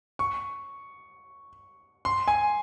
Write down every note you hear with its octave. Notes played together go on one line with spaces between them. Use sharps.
C#6
C6
G#5